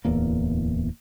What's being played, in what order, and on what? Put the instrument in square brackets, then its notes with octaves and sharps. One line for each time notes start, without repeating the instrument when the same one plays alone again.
[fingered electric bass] D1 E2 A#3